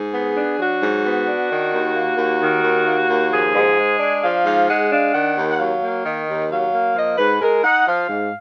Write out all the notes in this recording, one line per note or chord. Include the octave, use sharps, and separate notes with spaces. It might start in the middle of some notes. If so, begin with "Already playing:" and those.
Already playing: G#2 G#4
B3
D4
F#3 F#4
G#2
B3
D4
D#3
D#2
A#3
D#2
D#3
D#2
A#3
D#2
F3 G#4
G#2
G#3
D4
F3 F5
G#2 F5
G#3 F#5
D4 F5
D#3 F#5
D#2
F#5
F#3 F5
A#3
D#3 D#5
D#2
F#3 F5
A#3
F3 D#5
G#2 B4
G#3 A#4
D#4 F#5
F3 F5
G#2